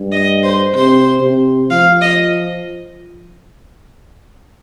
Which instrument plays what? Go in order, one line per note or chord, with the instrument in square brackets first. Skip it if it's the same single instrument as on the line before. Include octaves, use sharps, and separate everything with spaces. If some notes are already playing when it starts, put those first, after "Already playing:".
Already playing: [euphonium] G2
[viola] D#5
C5
[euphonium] C3 [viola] C5
[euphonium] C3
[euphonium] F3 [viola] F5
[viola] D#5